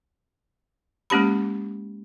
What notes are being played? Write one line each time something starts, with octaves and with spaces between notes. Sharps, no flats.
G#3 A#3 C#4 G4 B5